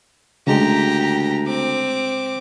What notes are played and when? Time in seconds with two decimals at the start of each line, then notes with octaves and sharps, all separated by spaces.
0.47 D2 C#3 G#3 G4 A#5
1.47 C4 D6